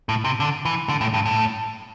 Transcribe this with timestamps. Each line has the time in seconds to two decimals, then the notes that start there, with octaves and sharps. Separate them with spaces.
0.09 A2
0.25 C3
0.40 D3
0.65 E3
0.89 D3
1.01 A2
1.14 G2
1.26 A2